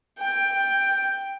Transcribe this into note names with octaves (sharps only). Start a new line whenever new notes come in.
G5